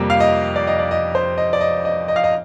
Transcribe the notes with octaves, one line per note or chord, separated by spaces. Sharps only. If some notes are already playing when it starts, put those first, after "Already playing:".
Already playing: F2 C3 G3 A#3
F5
D#5
D5
D#5
D5
D#5
C5
D#5
D5
D#5
D#5
D#5
F5
D#5